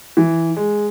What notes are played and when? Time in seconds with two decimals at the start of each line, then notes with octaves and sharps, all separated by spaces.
0.17 E3
0.57 G#3